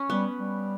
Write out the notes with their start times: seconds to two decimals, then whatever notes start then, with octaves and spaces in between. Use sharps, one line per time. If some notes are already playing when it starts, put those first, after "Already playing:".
Already playing: C#4
0.10 G3 B3
0.40 G3